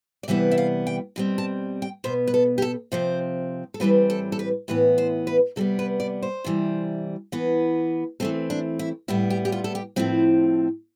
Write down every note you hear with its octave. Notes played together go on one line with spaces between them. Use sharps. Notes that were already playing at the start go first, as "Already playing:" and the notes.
D5
C3 E3 G3 B3 E5
E5
F5
G5
B2 G3 C4
A5
G5
B2 B3 C5
B4
A4
G4
A4
C3 F3 C4 C5
A4
A2 E3 G3 C4 B4
A4
A4
B4
A2 E3 B3 B4
C5
B4
C3 G3 B3 A4
B4
D5
C5
C3 E3 G3
E3 B3
E3 A3 C4 A4
D4
E4
A2 G3 B3 E4
G4
G4
F4
A4
G4
A2 F3 C4 E4